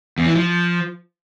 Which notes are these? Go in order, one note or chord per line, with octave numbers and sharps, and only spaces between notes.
E2
E3
F3